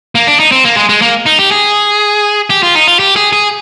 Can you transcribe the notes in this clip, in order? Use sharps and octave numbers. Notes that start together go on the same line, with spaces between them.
A#3
D4
D#4
C4
A#3
G#3
G#3
A#3
D#4
G4
G#4
G4
F4
D#4
F4
G4
G#4
G#4